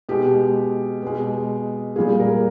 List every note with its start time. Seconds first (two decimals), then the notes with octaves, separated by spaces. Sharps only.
0.09 B2 G#3 G4
1.03 B2 G#3
1.96 A#2 G3 G#4
2.19 A#4